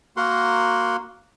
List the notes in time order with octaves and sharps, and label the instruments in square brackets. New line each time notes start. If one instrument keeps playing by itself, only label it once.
[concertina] A#3 F#4 A#4 F#5 C6